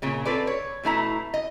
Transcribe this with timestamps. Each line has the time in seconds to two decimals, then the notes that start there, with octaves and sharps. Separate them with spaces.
0.02 A#2 C#3 C#4
0.25 C4 F4 A4 B4 D5
0.47 C#5
0.83 B2 A3 E4 A#5
1.34 D#5